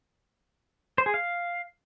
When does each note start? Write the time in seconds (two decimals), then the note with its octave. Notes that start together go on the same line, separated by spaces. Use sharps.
0.98 C5
1.06 G#4
1.14 F5